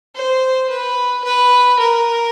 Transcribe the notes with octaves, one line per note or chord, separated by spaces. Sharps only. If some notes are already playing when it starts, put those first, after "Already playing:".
C5
B4
B4
A#4